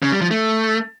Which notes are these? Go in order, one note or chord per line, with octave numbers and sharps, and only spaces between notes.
C#3
G3
F3
A3